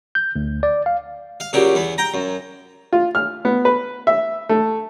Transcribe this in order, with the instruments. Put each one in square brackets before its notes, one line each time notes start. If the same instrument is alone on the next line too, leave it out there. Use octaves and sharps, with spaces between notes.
[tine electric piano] G6
D2
D5
F5
[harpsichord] F5
A#2 C#3 F#3 G4
E2 B3
G5 A#5
F#2
[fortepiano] F4
F6
B3
B4
E5
A3